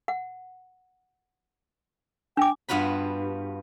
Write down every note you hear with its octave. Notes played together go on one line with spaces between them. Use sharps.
F#5
D4 G5 D6
G2 B3 F4 F#4 B5